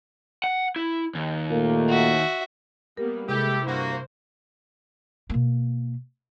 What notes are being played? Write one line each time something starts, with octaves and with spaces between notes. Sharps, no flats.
F#5
E4
D#2
A#2 A3 A#3
F#4 E5
G3 A#3 B3 A#4
C3 G#3 E4 G4 A4
G2 A#3 F#4 C5
B2 A#3